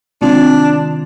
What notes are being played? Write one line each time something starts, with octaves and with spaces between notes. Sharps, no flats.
C3 D#3 G#3 C4 D4 F4